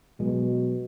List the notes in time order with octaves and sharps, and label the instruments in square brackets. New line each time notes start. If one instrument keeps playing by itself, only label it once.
[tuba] B2 [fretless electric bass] F#3 G#3